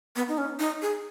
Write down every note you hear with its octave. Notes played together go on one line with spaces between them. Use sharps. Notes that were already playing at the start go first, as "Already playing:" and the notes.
B3
D#4
C#4
D#4
G#4